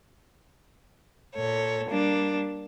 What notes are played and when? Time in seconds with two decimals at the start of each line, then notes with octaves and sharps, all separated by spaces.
1.34 A#2 A4 C#5
1.90 G3 A#3 D4